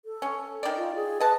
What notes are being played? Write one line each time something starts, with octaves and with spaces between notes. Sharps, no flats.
A4
C#4
D#3 D5
F4
G#4
B4 D#5 A5